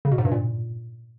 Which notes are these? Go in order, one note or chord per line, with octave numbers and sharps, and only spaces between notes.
C#3
B2
G#2
G2
A#2